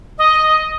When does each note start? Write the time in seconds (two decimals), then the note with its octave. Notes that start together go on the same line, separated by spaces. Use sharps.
0.18 D#5